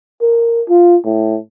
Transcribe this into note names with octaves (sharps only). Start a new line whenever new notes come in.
A#4
F4
A2